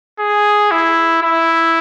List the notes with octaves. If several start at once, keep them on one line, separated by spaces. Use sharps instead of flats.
G#4
E4
E4